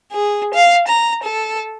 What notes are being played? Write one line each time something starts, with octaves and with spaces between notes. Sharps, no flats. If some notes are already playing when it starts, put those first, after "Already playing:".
G#4
F5
A#5
A4